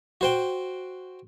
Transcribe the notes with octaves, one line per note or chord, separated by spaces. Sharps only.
F#4 C5 G5